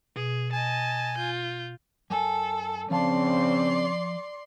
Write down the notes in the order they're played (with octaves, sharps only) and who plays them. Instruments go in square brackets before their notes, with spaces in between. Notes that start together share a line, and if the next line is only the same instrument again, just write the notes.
[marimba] B2 [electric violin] G#4
[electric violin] D#5 A5 [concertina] G#5
[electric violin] F4 G6
[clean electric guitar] F#2 G#5 [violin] A4
[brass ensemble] C#3 C4 [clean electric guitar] F3 F5 A5 [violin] D5 C6